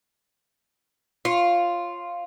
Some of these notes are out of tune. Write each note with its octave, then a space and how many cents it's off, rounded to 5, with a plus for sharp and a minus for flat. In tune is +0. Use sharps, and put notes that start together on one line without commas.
F4 +0 C#5 -25